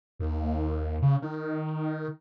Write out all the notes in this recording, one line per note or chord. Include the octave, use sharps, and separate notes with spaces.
D#2
C#3
D#3